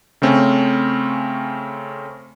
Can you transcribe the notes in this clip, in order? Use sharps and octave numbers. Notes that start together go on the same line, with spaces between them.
C#3 A3 C4 C#4